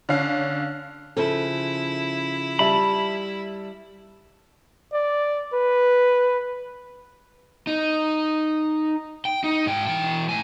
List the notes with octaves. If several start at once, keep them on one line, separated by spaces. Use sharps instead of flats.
D3 C#4 F5
C#3 F3 E4 A4
G3 E5 A5 B5
D5
B4
D#4
G5
D#4
G#2 G5
E3 G5
A2 G#5